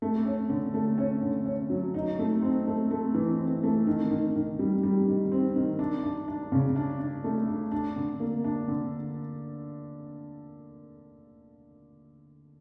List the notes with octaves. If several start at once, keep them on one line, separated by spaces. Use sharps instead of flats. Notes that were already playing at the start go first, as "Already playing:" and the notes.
A3
C#4
D3
A3
C#4
D3
C#4
F#3
D#4
A3
C4
A3
A3
E3
C4
A3
D#3
D#3
D#3
G3
G3
D#3
C4
D#3
D4
D4
D4
C#3
D4
D4
A3
D4
D4
D3
A#3
D4
D3